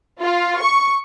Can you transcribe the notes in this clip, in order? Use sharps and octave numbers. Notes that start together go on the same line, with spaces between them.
F4
C#6